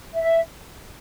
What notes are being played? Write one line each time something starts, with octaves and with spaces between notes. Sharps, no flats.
E5